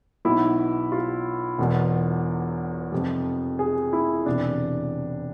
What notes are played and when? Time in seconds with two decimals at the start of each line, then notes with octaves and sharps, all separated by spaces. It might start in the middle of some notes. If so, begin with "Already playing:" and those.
0.25 B1 B2 E4
0.92 F4
1.58 E1 E2 B2
2.92 F1 F2 C3 F3
3.59 G#4
3.93 E4
4.26 E1 E2 C3 D4